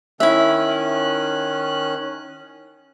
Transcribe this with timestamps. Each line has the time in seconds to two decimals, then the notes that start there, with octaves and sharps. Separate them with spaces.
0.20 D#3 C#4 E4 E5 F#6